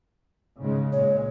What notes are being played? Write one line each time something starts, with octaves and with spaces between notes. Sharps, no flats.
G#2 C#3 G#3
A#2 G#3 C#5